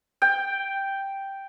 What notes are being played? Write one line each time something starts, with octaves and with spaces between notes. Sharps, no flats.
G5